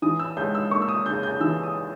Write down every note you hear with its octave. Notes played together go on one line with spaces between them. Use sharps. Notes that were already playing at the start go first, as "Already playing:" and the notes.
E3 D#6
E6
C#2 G6
E6
A#3 C#6
E6
D#6
C#3 G6
G6
E3 E6
D#6